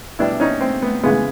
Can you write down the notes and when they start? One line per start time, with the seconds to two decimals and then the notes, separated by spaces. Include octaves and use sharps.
0.19 B2 G3 B3 D4 E4
0.40 C#4 D#4
0.61 C4
0.82 B3
1.03 C#3 E3 G#3 B3